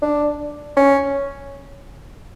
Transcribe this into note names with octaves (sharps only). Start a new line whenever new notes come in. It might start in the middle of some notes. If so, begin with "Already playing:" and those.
D4
C#4